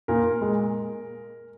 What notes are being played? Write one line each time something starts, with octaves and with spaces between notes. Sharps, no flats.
A#2 A#4
G#3